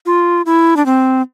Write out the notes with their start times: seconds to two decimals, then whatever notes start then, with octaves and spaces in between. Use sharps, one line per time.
0.06 F4
0.46 E4
0.77 D4
0.86 C4